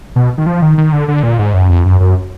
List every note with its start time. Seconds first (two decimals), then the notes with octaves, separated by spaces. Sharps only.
0.16 B2
0.38 D#3
0.46 F3
0.62 D#3
0.78 D#3
0.93 D3
1.08 D3
1.23 A#2
1.39 G#2
1.54 F#2
1.69 F2
1.86 F#2
2.01 F#2